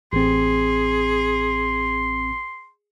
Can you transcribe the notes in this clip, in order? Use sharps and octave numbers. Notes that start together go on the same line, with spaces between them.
A1 C4 G#4 C6